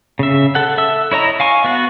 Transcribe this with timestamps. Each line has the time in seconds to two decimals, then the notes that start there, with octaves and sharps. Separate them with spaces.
0.19 C#3 E5
0.55 A4 F#5
0.77 A4 E5 E6
1.12 E4 C#5 D#5 A#5
1.40 F5 G#5 C#6
1.64 B3 F#4